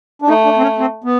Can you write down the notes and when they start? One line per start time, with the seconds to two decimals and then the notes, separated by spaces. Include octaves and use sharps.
0.22 D4
0.28 A3 D#4
0.45 D4
0.57 C4
0.62 C#4
0.78 C4
1.04 B3